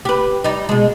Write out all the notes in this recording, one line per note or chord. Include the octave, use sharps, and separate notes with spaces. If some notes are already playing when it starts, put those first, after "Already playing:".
G4 B4
G3 D#4
B2 G#3